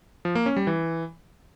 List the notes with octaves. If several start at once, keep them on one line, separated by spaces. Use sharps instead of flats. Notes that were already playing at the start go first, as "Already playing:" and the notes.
F3
A#3
C#4
G3
E3